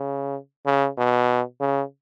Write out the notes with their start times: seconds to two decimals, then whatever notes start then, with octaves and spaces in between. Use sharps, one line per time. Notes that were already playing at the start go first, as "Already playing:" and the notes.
Already playing: C#3
0.66 C#3
0.97 B2
1.60 C#3